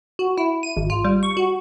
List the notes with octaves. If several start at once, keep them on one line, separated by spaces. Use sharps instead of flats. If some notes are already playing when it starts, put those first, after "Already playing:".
F#4
E4
D#7
G#1
F4
G3
C#6
F#4